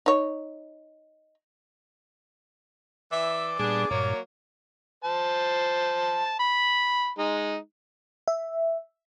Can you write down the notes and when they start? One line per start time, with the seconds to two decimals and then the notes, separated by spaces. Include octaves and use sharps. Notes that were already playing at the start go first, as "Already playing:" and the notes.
0.06 D#4 C#5
3.12 E3 D5 E5
3.60 A#2 G3 B3 D4 G#4
3.91 G2 A#2 F#3 A#3 C#5
5.04 C5 A5
6.40 B5
7.18 G#3 D#4
8.28 E5